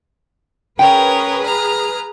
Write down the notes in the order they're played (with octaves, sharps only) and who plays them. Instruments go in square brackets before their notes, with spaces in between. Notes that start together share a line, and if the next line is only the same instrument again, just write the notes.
[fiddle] C#4 A#4 [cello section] G#4 B4 [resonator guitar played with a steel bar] G5
[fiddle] A#5 F6